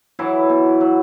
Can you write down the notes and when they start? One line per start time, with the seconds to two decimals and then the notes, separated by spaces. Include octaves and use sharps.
0.19 E3 F#3 E4
0.49 B2
0.81 F#3